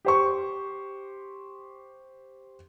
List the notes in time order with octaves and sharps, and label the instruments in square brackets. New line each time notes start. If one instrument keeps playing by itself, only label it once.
[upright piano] G4 C5 C#6